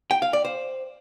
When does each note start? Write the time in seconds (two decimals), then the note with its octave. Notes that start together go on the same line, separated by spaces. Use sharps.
0.11 G5
0.22 F5
0.33 D5
0.45 C5